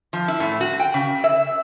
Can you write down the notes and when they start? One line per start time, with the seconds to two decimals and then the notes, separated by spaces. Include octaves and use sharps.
0.13 F3
0.28 E4
0.40 A2
0.61 F#4
0.79 G5
0.94 C#3
1.24 E5